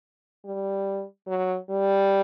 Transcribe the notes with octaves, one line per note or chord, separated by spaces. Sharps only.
G3
F#3
G3